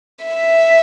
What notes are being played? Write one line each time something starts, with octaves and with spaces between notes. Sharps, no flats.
E5